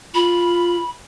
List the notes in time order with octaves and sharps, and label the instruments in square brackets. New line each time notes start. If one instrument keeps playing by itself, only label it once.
[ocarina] F4 [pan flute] B5